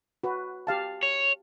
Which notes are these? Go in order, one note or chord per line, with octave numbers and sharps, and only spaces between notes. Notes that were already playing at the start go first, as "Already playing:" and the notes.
F#4 B4
G4 F5 A5
C#5